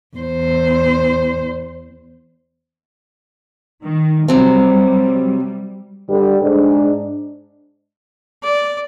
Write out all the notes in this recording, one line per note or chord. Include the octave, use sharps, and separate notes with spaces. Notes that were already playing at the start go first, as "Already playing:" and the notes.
E2 C5
D#3
C3 F#3 G3 C4
G2 D3 G3
G#2 D4
D5